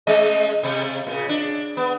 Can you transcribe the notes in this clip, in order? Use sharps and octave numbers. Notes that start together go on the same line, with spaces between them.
G#3 C#4 D#5
C3
A#2 C#3
D4
B3